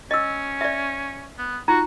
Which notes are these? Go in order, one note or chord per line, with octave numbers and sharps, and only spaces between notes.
C#4 D#5 E6
D5 E5
B3
D#4 F4 F#4 A#5